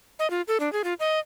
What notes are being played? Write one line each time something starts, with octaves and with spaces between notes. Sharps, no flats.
D#5
F4
A4
D4
G#4
F4
D#5